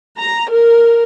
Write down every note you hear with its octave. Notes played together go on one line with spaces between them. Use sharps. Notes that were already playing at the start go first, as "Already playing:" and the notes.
A#5
A#4